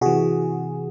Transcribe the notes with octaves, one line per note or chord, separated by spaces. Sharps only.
C3 E3 F#4 G#4